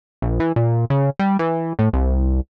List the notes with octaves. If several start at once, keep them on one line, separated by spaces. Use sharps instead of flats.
A#1
E3
A#2
C#3
G3
E3
A2
C2